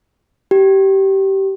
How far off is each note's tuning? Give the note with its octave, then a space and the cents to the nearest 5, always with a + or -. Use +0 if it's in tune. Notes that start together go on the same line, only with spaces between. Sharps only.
G4 -20